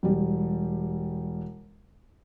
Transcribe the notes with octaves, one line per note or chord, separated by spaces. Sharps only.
E1 G3